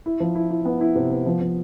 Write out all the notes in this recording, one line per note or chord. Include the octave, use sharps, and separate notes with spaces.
E4
F3
E4
E4
B3
E4
C3
B3
F3
F3